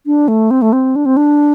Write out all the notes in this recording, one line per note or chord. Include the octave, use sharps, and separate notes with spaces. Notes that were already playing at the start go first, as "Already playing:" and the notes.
D4
A3
C4
A3
C4
D4
C4
D4